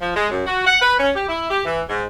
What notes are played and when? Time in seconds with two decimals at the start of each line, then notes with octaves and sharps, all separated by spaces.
0.01 F3
0.14 G#3
0.30 F#2
0.46 F#4
0.66 F#5
0.81 B4
0.99 C#4
1.15 G4
1.29 E4
1.49 G4
1.65 E3
1.89 G#2